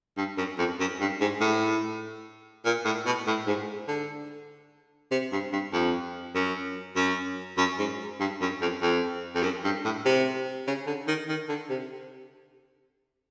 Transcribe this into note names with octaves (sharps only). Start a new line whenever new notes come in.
G2
F#2
F2
F#2
G2
G#2
A2
A#2
A2
B2
A2
G#2
D3
C3
G2
G2
F2
F#2
F#2
F#2
G#2
G2
F#2
F2
F2
F2
F#2
G2
A2
C3
C#3
D3
D#3
D#3
D3
C3